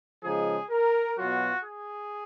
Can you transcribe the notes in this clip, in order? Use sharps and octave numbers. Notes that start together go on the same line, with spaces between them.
C#3 F3 G#3 D#4 G#4
A#4
B2 F#3 B3 F4 F#4
G#4